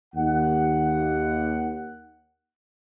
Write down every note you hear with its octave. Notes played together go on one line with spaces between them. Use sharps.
D#2 F#5